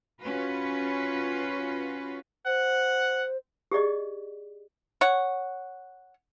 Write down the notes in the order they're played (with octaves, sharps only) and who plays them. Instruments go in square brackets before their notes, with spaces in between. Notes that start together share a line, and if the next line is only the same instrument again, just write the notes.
[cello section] C#4 F4 F#4 B4
[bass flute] C5 [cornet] F#5
[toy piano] G4 G#4 D5 D#5
[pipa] C#5 F#5